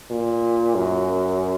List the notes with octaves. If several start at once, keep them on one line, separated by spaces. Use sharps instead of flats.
A#2
F#2